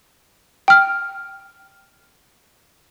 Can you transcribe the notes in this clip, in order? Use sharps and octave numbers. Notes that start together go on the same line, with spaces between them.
G5 F6